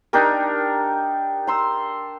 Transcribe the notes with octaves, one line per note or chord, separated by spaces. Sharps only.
D4 D#4 G4 A#4
A#5 C6 E6